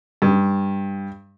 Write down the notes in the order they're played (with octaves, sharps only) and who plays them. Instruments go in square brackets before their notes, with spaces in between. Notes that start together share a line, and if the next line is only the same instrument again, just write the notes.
[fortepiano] G2